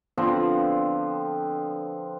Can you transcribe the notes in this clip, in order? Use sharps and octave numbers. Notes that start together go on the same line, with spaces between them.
D3 F3 B3 C4